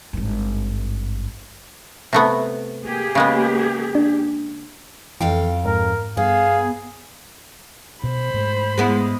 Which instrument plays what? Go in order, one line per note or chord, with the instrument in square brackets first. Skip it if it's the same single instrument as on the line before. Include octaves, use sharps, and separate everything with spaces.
[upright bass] G#1 G2
[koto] C3 A3 B3
[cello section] A#3 G4 G#4
[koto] C#3 G#3 B3
[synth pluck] D4
[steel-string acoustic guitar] F2 F5 G5 [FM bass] E3
[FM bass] G#2 [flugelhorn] A#4
[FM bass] G2 [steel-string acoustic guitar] B3 [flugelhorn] G#4 [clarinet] F5
[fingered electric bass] B2 [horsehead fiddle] C5 B5
[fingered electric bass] G#2 A3
[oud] G#3 B3 E4